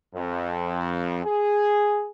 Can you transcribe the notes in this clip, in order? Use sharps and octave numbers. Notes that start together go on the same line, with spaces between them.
F2
G#4